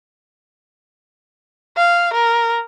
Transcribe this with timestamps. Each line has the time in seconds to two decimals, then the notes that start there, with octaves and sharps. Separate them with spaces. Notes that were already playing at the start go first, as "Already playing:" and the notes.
1.77 F5
2.13 A#4